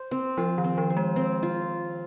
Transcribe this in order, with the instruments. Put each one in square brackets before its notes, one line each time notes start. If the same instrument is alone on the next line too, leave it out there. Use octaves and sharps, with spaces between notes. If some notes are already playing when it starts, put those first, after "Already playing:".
Already playing: [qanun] C5
C4
[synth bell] F3 [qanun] F4
[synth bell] D#3
[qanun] C4
[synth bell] F3
[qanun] C5
[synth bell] G#3
[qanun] C4
F4